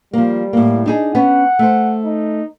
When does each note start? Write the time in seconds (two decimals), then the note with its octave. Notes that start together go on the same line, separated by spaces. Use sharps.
0.13 F3 G3 A#3
0.53 A2 A#3
0.86 D4 D#4 G#4
1.15 B3 C#4 F#5
1.59 A3 C5
2.04 D#4